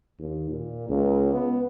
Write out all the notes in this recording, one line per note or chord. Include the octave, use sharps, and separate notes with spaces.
D#2
A#2
C#2
B3